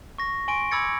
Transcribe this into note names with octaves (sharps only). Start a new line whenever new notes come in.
C#6 A#6
G#5 C6 C#6 D7
B5 D6 E6 G#6 A6 C#7